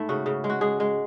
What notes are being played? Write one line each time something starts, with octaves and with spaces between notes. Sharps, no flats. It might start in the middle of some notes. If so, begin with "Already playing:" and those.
Already playing: G#2 A3 E4
C#3 F#4
C#3
G#3
F#4
G#3 G#4
G#3